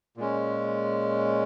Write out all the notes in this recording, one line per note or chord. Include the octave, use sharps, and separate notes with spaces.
A#2 G#3 C#4